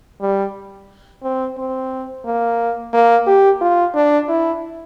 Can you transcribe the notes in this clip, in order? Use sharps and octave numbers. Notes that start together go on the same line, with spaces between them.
G3
C4
C4
A#3
A#3
G4
F4
D4
E4